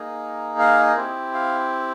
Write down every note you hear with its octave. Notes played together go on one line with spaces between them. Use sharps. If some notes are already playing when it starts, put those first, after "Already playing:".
Already playing: A#3 D#4 G#4
F5
C4 E4 G4
F5